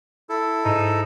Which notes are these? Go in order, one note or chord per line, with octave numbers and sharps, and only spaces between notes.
E4 A4
G#2 D#4 E7